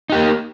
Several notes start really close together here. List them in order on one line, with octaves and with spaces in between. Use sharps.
D#4 G4 A#3